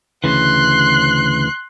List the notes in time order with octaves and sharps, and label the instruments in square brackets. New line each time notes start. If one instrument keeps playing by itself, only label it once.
[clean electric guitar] D2 C#3 E3 [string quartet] C6 F#6